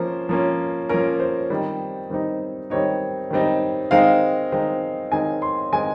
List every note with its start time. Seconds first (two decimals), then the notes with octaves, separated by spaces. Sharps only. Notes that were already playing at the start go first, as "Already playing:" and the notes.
Already playing: F3 A#3 C#4 C5
0.29 F3 A#3 C#4
0.89 F3 A#3 C#4 A#4
1.20 C5
1.50 D#3 G3 C4 D#4
2.10 D#3 G3 C4 D#4
2.70 D#3 G3 C4 D#4 C#5
3.30 D#3 G3 C4 D#4
3.91 D#3 G#3 C4 D#4 F5
4.52 D#3 G#3 C4 D#4
5.12 D#3 G#3 C4 D#4 G#5
5.42 C6
5.72 D#3 G#3 C4 D#4 G#5